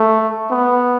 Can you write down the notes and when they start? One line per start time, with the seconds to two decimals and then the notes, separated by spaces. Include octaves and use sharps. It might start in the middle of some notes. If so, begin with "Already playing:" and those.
Already playing: A3
0.51 B3